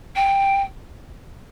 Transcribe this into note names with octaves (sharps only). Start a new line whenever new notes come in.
G5